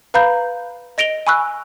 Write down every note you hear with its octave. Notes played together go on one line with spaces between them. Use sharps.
B4 F5 A#5 B5 G6
D#5 A#6 D7 F7 G7
G#5 B5 C#6 E6 F#6